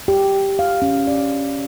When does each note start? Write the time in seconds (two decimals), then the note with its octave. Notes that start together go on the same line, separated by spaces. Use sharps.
0.08 G4
0.59 F5
0.82 C#4
1.07 D5